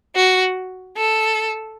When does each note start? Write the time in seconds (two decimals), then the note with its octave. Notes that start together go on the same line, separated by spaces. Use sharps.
0.15 F#4
0.97 A4